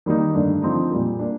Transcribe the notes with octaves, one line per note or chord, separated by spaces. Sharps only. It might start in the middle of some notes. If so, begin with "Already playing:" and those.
D#3 G3 A#3 D#4
G2 D3 A3 D4
D3 F3 C4 D#4
A#2 G3 A#3
A#3 D4